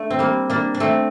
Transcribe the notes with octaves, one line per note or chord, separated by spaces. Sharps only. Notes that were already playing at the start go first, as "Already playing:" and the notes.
Already playing: A3 D4
C4
G3 A#3
A#3 D4
D4
A3 C4